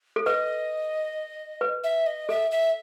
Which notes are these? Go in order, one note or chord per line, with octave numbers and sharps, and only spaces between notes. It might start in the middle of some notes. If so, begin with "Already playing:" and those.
A4
B4 D#5
B4
E5
D#5
A4 E5
E5